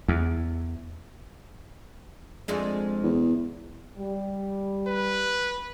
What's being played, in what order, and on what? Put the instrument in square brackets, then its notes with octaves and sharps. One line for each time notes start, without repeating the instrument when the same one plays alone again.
[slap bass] E2
[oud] F2 G#3 D4
[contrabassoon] E2
[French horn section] G3
[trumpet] B4